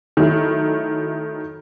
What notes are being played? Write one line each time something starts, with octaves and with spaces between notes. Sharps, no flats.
D#3 F#3 A3 E4